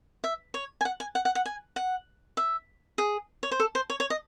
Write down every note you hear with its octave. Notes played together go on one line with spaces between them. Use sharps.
E5
C#5
G#5
F#5
G#5
F#5
F#5
F#5
G#5
F#5
E5
G#4
C#5
C5
A4
C5
C#5
C#5
D#5